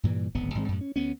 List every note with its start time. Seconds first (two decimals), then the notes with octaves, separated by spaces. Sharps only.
0.03 G2 A#2 E3 G3
0.34 D1 G#1 B3
0.55 G#1 G#2 G#3 C4
0.68 F#2 A2
0.81 C#4
0.96 D2 B3 C#4